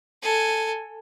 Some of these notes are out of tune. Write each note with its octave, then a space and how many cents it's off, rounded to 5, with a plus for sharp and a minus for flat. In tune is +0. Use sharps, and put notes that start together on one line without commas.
A4 +10 G#5 +0